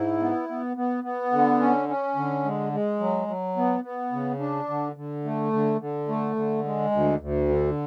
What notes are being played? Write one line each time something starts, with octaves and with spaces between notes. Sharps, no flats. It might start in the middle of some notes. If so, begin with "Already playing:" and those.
Already playing: G#2 E4
B3
B3
B3
B3
D3
C#4
C#4
D3
G#3
G#3
F#3
F#3
B3
B3
C#3
D4
D3
D3
A3
D3
D3
A3
D3
G#3
D2
D2
D3